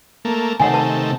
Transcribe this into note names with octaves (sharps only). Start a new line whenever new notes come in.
A3 A#3
C3 D#3 A3 C#5 F#5 G#5
B4 A5